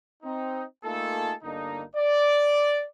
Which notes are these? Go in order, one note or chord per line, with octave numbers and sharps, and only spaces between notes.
C4 D#4
A3 A#3 D#4 F4 G#4 A4
G1 D3 A#3 D4 D#4
D5